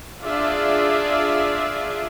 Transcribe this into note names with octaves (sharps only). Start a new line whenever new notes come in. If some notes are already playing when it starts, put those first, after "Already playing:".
D4 F4 G#4 D5 E5